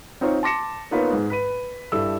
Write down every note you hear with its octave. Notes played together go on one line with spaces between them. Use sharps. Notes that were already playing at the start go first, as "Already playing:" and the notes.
C4 D#4 F4 C5 C#5
A5 C6 D6 A#6 C#7 E7
A#3 B3 D#4 F4 B4 C#5
G#2 G#3
B4 B5 D#7
G2 E4 G4 A4 E6